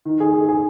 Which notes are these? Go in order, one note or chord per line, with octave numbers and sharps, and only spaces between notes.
D#3
G#4
G#4
G#4